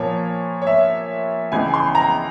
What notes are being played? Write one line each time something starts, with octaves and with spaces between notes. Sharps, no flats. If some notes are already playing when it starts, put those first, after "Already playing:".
Already playing: A#2 F3 A#3 C#5
C#5
E5
C#2 C#3 E3 G#3 G#5
C6
A#5